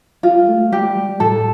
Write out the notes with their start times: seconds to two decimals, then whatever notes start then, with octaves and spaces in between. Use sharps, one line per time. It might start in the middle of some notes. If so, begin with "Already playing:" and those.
0.23 G3 F4
0.42 G3
0.48 A3
0.72 G3 G4
0.84 G3
0.96 G3
1.09 G3
1.20 A2 A4